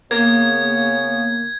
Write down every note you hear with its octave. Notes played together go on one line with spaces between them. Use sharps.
C#3 A#3 B3 G#6